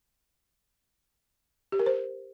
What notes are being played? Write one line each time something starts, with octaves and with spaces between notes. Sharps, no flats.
G4
A#4
C5